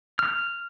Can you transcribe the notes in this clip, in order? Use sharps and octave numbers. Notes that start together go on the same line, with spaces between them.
F6